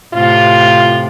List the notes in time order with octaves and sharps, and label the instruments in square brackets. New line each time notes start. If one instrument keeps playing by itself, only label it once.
[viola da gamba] A2 C3 [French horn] F4